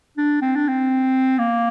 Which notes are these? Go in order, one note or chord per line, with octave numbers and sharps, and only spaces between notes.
D4
C4
D4
C4
A#3